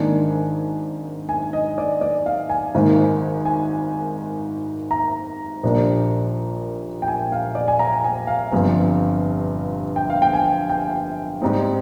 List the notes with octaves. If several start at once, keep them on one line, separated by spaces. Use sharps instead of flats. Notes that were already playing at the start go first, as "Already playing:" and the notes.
Already playing: G#1 G#2 D#3 A#3 D4 G#5
G#5
D#5
D5
D5
F5
G#5
G#1 G#2 D#3 A#3
G#5
A#5
A#1 A#2 G3 A#3 D4
G5
G#5
F5
D5
G#5
A#5
G#5
F5
G1 G2 F3 C4 F5
G5
F5
G5
G#5
G5
G#2 G3 C4 D#4